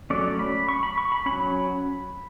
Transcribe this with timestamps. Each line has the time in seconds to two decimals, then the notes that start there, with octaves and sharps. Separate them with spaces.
0.10 F#3 A3 C#4 D5
0.39 B5
0.69 C#6
0.83 B5
0.98 C#6
1.12 B5
1.26 F#3 C#4 B5